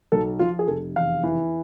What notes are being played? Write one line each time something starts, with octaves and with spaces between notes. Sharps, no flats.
B1 A4
F3 F4
G#4
F1 A4
E2 F5
E3